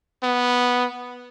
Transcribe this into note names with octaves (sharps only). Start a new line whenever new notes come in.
B3